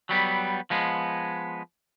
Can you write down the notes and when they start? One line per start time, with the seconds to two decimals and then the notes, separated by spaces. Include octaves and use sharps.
0.09 F#3 G3 B3
0.70 F3 G#3 B3